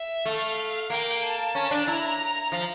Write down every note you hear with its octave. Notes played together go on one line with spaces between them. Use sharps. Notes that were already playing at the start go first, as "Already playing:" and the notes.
Already playing: E5
A3 F5
A#3 G5
A5
C#4
D4
E4 A#5
F3